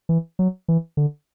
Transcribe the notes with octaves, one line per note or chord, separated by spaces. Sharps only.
E3
F#3
E3
D3